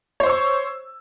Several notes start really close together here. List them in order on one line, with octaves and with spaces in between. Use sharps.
C#5 C5 E6 C#6